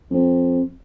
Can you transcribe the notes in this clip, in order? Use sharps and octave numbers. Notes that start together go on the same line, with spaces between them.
F2